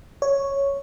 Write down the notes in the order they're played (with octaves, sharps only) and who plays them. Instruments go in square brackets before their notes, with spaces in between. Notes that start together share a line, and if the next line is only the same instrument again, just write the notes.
[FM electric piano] C#5